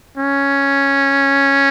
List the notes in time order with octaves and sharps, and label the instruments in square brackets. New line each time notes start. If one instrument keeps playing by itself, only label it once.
[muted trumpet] C#4